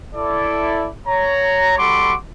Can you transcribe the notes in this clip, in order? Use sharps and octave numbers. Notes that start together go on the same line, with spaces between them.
E4 A4 D5
C#5 A#5
G3 F#4 A4 B5 C6 D6